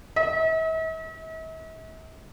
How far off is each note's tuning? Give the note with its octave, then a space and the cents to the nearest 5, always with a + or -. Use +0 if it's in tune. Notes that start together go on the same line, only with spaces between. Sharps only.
E5 -45